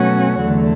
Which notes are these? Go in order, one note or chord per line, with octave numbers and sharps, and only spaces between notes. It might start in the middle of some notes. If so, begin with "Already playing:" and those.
Already playing: B2 F#3 A3 C#4 F#4
E2 D3 F#3 A3